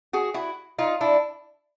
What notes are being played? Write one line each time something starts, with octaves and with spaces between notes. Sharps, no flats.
F#4 G#4
E4 F#4
D#4 F4
D4 E4